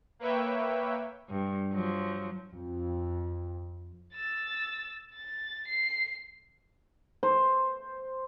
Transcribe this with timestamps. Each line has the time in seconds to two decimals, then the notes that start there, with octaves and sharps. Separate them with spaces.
0.19 A#3 B4 C#5 E5 G5
1.29 G2
1.73 F3 F#3
2.52 F2
4.14 E6 A6
5.14 A6
5.68 C7
7.23 C5